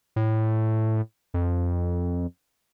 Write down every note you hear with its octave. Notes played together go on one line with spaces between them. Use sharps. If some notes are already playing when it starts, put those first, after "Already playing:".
A2
F2